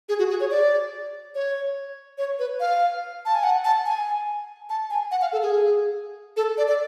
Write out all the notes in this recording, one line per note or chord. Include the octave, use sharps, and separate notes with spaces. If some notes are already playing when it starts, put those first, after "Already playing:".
G#4
F#4
G#4
C#5
D5
C#5
C#5
B4
F5
A5
G#5
F#5
A5
G#5
A5
G#5
F#5
F5
A4
G#4
A4
D5
D5